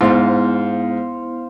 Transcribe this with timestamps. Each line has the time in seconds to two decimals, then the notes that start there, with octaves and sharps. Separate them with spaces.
0.01 G#2 B3 E4 C5 F5